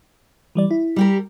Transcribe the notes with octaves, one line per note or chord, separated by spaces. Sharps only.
E3 G3 D5
E4
G3 G4 A#4